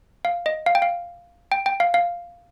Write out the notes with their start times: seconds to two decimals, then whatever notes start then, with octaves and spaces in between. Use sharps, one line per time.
0.25 F5
0.46 D#5
0.66 F5
0.75 G5
0.82 F5
1.52 G5
1.66 G5
1.80 F5
1.94 F5